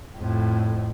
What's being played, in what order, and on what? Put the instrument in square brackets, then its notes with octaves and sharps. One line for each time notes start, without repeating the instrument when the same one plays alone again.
[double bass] F2 A2